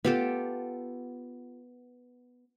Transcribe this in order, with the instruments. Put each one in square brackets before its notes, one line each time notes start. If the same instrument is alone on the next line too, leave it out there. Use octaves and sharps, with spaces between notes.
[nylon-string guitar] B3 [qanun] F4 G4 A4